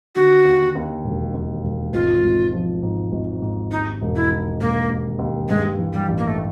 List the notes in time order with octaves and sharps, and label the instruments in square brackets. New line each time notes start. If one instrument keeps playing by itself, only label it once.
[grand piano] D3 [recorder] F#4
[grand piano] D#2
D#2
E1
D#2
E1
[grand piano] G#1 [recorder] F4
[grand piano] G#1
F3
G#2
G#1
G#2
[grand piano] D#2 [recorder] D#4
[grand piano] E1
[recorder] E4
[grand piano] D#3
[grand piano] E1 [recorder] A#3
[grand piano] D#2
D#2
[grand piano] G2 [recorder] G#3
[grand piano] E3
[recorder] G3
[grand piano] A1
[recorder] A#3
A3